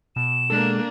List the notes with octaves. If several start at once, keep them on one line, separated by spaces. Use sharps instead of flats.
B2 E7
G#3 A#3 D4 A4